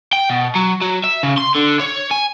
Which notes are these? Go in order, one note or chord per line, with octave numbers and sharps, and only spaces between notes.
G5
B2
F#3
F#3
E5
C#3
C6
D3
C#5
G#5